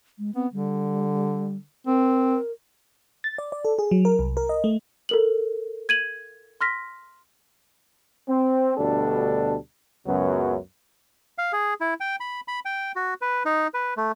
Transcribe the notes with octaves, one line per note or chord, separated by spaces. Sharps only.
G#3
B3 C4
D3 G3
C4 A#4
A6
D5
D5
A4
G#4
F#3
A#4
C2
A#4
D#5
A3
A4 A#4 F#7
G#6 D#7 F#7
C6 F6 A#6 B6
C4
D2 B2 G3 D4 A4
C#2 F#2 C#3 F#3 B3
F5
G#4
E4
G5
B5
B5
G5
F#4
B4
D#4
B4
A3